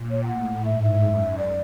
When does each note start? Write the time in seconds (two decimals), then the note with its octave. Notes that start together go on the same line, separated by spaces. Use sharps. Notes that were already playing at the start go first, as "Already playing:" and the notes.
Already playing: A#2
0.11 C#5
0.23 G5
0.28 A2 F#5
0.65 G#2 E5
0.83 E5
1.01 F#2
1.38 D5